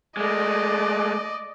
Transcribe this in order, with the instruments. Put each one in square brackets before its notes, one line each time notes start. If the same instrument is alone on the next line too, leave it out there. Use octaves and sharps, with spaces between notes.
[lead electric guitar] G#3 A3 [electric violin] D5 D#5